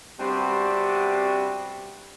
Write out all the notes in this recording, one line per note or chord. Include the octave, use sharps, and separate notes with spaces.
C3 G3 B3 C4 D4 F#4